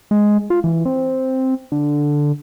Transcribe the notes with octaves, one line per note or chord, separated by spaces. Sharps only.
G#3
F4
E3
C4
D3